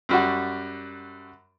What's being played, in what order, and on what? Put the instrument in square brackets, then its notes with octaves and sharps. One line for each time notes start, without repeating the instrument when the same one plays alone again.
[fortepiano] F#2 G3 F#4